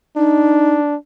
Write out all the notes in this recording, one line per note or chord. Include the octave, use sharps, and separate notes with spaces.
D4 D#4